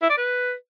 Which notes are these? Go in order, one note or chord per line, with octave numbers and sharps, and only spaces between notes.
E4
D5
B4